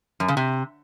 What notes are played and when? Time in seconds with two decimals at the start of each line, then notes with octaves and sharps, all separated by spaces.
0.20 F#2
0.28 C#3
0.37 C3